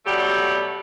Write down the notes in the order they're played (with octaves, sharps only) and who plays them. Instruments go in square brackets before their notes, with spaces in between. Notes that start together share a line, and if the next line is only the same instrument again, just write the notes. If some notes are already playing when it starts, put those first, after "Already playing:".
[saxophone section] B2 F#3 G3 A3 G4